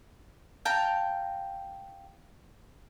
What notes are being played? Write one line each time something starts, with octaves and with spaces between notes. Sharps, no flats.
F5 G5 A5 A#5